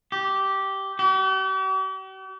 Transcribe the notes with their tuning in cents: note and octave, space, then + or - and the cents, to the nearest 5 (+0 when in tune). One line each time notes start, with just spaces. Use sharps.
G4 -10
G4 -45